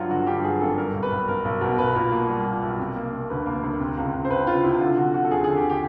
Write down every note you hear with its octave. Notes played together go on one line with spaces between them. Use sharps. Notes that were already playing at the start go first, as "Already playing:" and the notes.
Already playing: G2 F#3 F4 F#4
D3 F#4
G2 G4
F#3 G#4
G#1 A4
G3 A#4
B1
B4
B1
B1 A#4
B1
B2 A#4
B1 B4
A#2 A#4
A#3 A#4
G3
A#2
B1
C3
A#3
C3
D2 B4
A#3
D2
C3
C#2
C#2
C5
C#2 B4
C#2 F4
C3 E4
D3 F4
D3 F#4
F3 F#4
A4
D#2 G#4
D3 G#4
G4
G4